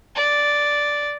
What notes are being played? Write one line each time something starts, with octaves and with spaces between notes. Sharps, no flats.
D5